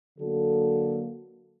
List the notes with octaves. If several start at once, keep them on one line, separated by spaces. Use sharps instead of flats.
D3 F#3 A#3 F#4 A4